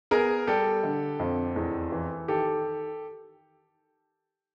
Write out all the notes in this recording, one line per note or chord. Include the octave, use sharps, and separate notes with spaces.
B3 G#4 A#4
G3 G4 A4
D3
F2
E2
E3
D#3 G4 A4